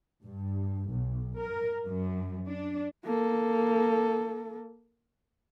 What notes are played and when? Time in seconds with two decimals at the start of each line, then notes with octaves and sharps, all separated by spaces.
0.24 G2
0.91 B1
1.41 A#4
1.85 F#2
2.47 D4
3.04 A#3 A4